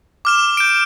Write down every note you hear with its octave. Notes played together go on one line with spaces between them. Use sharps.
D6 F6 E7
G6 D7